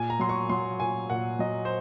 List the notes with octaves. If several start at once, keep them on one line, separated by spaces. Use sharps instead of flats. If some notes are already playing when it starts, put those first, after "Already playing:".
Already playing: A#2 G#5
A#5
F#3 C6
C#6
F#3 C6
A#2 G#5
A#2 F#5
F#3 D#5
C5